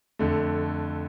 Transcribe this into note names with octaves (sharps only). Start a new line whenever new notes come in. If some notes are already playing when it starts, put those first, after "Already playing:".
F2 D3 A3